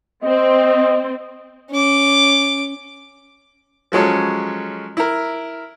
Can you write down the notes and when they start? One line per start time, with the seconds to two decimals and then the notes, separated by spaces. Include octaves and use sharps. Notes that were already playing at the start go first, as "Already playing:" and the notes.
0.24 C4 D#5
1.70 C#4 D6
3.92 F3 F#3 G#3 C#4 A4
4.97 E4 A#4